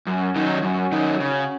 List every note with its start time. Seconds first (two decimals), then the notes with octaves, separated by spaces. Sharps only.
0.07 F#2 C#4 F#4
0.36 D#3 F#3 D#4
0.63 F#2 C#4 F#4
0.92 D#3 F#3 D#4
1.20 C#3